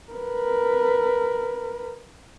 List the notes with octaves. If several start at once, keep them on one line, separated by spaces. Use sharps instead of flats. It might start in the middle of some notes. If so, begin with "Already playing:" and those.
A#4 B4